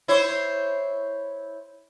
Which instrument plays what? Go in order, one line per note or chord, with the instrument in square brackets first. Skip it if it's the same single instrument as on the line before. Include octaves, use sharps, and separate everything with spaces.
[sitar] E4 C5 C#5